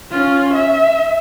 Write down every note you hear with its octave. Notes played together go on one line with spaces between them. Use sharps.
C#4 F4
E5